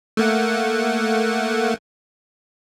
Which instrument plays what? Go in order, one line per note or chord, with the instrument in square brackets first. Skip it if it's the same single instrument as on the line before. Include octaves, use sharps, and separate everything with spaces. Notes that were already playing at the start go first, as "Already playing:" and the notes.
[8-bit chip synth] A3 A#3 F#5